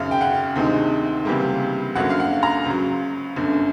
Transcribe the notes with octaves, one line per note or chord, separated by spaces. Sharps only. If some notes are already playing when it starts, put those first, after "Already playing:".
Already playing: G#1 F#2 C#3 F5
G5
F#5
D2 C3 D#3 G#3
C#2 C3 E3 G3 A#3
G#1 F#2 D3 F#3 A#3 F#5
F5
F#5
A#5
C#2 C#3 F#3
G1 F#2 D3